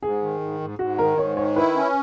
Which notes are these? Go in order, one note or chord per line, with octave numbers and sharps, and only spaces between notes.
G#2 G#4
D#3
G#2
G#2
G#2 F#4
D#3 A#4
G#2 C#5
D#3 C#5
E4 B4
C#4